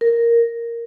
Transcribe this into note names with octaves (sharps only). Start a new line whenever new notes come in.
A#4